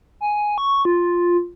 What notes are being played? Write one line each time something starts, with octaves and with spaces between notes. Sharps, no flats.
G#5
C#6
F4